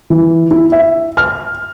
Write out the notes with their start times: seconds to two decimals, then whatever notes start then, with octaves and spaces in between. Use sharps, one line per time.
0.10 E3
0.51 E4
0.72 E5
1.17 F6